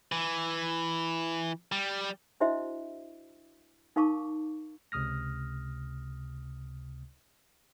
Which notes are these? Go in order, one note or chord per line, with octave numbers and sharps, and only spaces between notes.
E3
G3
D4 E4 F#4 C5 D#5 E5
D#4 A#4 F5 A5 C#6 D6
C#2 C3 D#6 F6 A#6